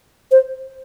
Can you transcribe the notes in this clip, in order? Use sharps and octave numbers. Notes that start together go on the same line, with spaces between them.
C5